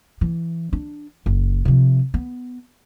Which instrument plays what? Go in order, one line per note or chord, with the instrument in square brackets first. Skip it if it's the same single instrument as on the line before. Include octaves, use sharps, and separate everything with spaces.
[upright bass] E3
D4
F#1
C3 F3
B3